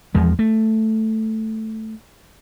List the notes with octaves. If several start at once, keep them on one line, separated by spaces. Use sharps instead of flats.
E2 F3 G#3
A3